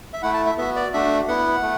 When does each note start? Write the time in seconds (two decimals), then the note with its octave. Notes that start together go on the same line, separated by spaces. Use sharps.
0.13 E5
0.23 A3 E4 F#5
0.34 A5
0.46 E5
0.57 B3 F#4 E5
0.76 D5
0.93 A3 D4 F#4 E5
1.28 B3 E4 F#5
1.63 A3